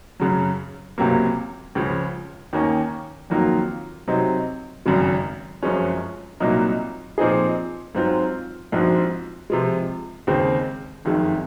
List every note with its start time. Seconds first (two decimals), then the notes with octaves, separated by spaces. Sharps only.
0.20 F#2 C#3 F#3
0.98 C#2 C3 F#3 A#3
1.75 C#2 C#3 F3
2.53 D#2 D#3 A#3 C#4
3.30 F2 D#3 F#3 A#3 F4
4.08 C3 F#3 C4 D#4
4.85 G#1 F#2 C#3 G#3
5.63 F#1 F#2 F3 G#3 C#4
6.40 C2 A#2 F#3 A#3 D#4
7.18 A#2 F3 C4 D#4 G#4
7.95 G#2 F#3 C4 F4
8.72 A#1 G#2 F3 C4 F#4
9.50 C3 F3 G#3
10.27 D#2 C#3 G#3 C4
11.05 F#1 F2 D#3 G#3